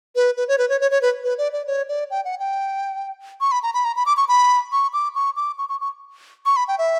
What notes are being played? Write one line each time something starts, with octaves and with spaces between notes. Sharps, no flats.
B4
B4
C#5
B4
C#5
C#5
C#5
B4
B4
D5
D5
C#5
D5
G5
F#5
G5
C#6
B5
A#5
B5
A#5
B5
D6
C#6
B5
C#6
D6
C#6
D6
C#6
C#6
C#6
C#6
B5
G5
E5